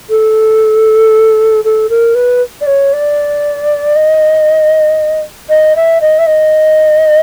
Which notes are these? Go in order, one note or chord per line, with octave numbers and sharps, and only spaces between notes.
A4
A4
A#4
B4
D5
C#5
D5
D#5
D#5
E5
D#5
E5
D#5